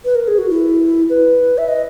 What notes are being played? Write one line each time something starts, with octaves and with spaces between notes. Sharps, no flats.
B4
A#4
G#4
F#4
E4
B4
E5
D#5